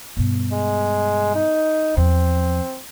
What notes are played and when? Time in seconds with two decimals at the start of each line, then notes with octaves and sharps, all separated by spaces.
0.17 G2 B2
0.53 G#3
1.35 D#4
1.97 E2 F3 C4